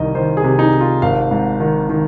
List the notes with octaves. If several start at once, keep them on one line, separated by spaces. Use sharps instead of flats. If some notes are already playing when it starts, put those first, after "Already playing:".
Already playing: C2 D#3 D#5
D#3 C5
G#4
C3
D#4
C3
F4
G#1 F5
G#2
D#3
D#3